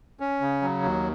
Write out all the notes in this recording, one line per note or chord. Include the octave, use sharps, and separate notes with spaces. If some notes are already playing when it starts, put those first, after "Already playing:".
C#4
C#3
F#3
D#2